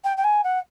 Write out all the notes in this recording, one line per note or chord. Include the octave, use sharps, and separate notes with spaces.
G5
G5
G#5
F#5